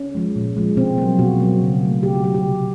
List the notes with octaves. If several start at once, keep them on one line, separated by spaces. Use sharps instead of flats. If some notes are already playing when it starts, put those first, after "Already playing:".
Already playing: C#4
F3 G#3
A#2
F3 G#3
B2 C4
F#3 A#3
B2 F#4
F#3 A#3
C#3
F#3 A3
C#3 G4
F#4
F#3 A3 G4
G4
C3